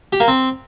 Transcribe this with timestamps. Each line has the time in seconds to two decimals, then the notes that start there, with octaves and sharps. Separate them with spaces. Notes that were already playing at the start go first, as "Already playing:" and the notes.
0.13 G4
0.20 A#3
0.28 C4